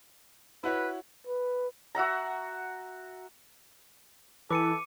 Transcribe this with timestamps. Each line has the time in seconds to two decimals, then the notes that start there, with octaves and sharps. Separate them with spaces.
0.64 E4 F#4 B4 C#5
1.27 B4
1.95 F#4 E5 F#5 A#5
4.50 E3 A4 D6 C#7 D#7